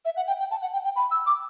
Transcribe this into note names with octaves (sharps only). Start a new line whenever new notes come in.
E5
F#5
G5
G5
A5
F#5
G5
G5
B5
E6
D6